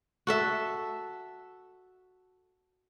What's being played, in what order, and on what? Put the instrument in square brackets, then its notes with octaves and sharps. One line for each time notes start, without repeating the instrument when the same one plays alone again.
[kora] F#4 A4 E5